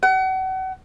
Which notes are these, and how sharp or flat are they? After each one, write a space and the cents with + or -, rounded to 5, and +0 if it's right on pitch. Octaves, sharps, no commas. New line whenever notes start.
F#5 +35